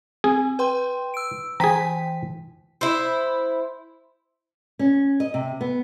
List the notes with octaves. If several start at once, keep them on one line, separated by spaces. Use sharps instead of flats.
C4 G#4
B4 G5 C6
E6 D7
E3 G#4 G5 A#5 B6
E4 C5
C#4
D#5
C3
B3